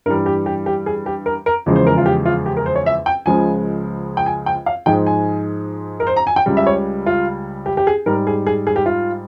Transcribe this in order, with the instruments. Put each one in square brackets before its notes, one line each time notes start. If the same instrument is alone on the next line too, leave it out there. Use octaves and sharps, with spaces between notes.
[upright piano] G2 E3 G3 A#4
G4
G4
G4
G#4
G4
A#4
A#4
E2 C#3 F3 G#3
C5
A#4
F4
G4
F4
G4
A#4
C5
C#5
E5
G5
C#2 C#3 F3 G#3 G#5
G5
G#5
G5
F5
G#2 F3 G#3 G5
G#5
A#4
C5
A#5
G#5
G5
C#2 C#3 G3
E5
C#5
F4
G4
G4
G#4
G#2 G3 A#4
G#4
G#4
G#4
G4
F4